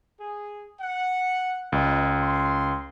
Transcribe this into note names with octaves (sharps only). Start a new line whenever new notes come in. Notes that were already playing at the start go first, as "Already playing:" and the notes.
G#4
F#5
C#2 F4 B4 D#5
C6